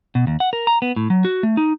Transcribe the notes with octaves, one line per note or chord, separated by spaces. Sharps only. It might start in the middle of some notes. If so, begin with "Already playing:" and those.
B2
D#2
F#5
A#4
A#5
B3
A2
F#3
F#4
A3
D#4